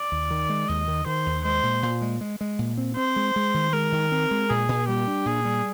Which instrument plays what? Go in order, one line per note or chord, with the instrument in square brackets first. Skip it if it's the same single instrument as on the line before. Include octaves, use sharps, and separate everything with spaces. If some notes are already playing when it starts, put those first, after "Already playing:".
Already playing: [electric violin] D5
[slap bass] D#2
D#3
G#3
[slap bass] D#2 [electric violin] D#5
[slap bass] D#3
[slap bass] D#3 [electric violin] C5
[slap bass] D#2
[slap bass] G#3 [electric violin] C5
[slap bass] A#2
A#2
G#3
G#3
G#3
A#2
C4
[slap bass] C4 [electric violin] C5
[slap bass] G#3
G#3
D#3
[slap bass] G#3 [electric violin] A#4
[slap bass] D#3
C4
G#3
[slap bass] A#2 [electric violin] G#4
[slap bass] A#2
[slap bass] G3 [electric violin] G4
[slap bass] D4
[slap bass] A#2 [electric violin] G#4
[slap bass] G3